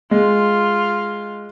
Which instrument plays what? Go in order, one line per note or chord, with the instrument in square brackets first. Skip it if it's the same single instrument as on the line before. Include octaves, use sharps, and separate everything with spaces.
[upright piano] G#3 [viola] F4